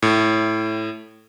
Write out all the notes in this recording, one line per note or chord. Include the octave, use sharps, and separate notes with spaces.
A2